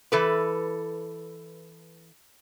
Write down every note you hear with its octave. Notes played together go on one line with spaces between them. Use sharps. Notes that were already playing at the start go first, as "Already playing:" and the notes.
E3 A4 B4